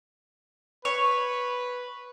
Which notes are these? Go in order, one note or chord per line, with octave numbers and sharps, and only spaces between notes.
B4 C#5